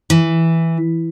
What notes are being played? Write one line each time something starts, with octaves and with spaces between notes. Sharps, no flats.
E3